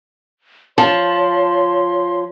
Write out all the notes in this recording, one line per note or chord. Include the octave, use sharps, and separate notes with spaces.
F3 C#5 A5 C6